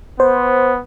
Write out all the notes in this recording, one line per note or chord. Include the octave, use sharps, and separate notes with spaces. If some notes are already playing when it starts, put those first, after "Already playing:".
B3 C5